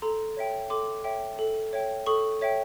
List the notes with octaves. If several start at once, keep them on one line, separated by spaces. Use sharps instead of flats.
A4 A#5 C6
C#5 E5 G5
A4 C6 D6
C#5 E5 G5
A4
C#5 E5 G5
A4 C#6 D#6
C#5 E5 G5